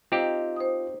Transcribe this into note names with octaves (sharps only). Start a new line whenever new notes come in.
C4 D#4 F4 G4
C5 D#6